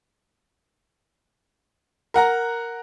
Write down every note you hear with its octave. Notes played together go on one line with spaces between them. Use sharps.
A#4 F#5 A#5